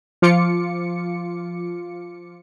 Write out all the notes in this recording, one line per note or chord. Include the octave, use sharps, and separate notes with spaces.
F3 F4 D6 C#7